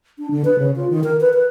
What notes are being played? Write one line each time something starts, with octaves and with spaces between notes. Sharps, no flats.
D4
D3
B4
C#3
F4
D#3
A#4
B4
B4